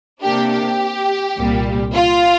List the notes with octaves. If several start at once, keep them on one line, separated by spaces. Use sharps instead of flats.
C3 A#3 D4 G4
G4
C2 A#2 G3
F4